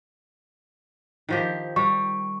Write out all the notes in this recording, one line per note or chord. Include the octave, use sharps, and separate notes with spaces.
D#3 F3 G4
G3 C#6